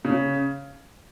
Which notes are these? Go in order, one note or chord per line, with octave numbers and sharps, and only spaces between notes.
C#3